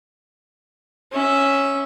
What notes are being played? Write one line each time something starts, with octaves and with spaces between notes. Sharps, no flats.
C#4 E5